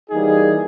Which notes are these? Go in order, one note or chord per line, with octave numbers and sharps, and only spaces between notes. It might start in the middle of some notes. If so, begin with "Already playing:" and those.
E3 G3 A#3 D#4 G#4